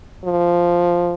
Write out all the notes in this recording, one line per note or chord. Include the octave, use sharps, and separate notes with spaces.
F3